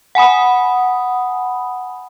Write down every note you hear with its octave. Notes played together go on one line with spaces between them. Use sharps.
F#5 G#5 B5 D#6